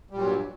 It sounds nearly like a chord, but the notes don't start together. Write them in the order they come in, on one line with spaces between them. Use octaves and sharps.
G3 A#2 F#3 G2